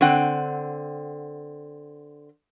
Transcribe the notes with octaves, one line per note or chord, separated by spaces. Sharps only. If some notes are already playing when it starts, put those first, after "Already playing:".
D3 C4 F#5 G5